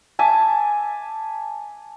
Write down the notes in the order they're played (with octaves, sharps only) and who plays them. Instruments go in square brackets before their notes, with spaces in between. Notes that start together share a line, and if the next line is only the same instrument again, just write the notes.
[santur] E5 G#5 A5 D6